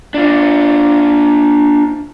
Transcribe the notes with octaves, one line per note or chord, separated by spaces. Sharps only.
D4 F4